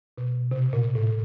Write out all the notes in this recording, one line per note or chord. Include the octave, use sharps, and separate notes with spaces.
B2
C3
A#2
A2